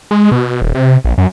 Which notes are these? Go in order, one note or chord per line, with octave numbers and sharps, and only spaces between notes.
G#3
B2
D#1
C3
A#1
F#2